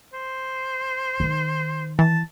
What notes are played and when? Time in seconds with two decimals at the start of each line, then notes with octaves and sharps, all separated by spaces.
0.14 C5
1.20 D#3 D#4
1.99 E3 A5